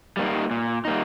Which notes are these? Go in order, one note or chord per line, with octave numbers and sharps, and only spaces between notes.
G3 A#3 D#4
A#2
G3 A#3 D#4